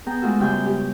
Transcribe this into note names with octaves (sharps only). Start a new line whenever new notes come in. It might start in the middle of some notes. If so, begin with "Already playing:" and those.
B3 G#4 G5 A#5
G#3 A3 F4 F#4 A4
F#2 C#3 G3 F4 G5 G#5
G4